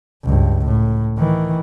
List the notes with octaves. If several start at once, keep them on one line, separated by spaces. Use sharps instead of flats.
C#2 G2
A2
D#3 E3